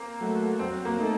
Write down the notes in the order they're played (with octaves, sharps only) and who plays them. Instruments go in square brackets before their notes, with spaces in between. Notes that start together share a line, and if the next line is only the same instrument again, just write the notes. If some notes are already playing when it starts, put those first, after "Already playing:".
Already playing: [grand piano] A#3 C4
[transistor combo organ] F#3 A3
[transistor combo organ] F#3 [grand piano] C4
[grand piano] A#3
[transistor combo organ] A3 D#4 A4